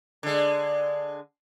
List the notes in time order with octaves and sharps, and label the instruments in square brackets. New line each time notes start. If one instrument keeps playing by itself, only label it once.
[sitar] D3 G#3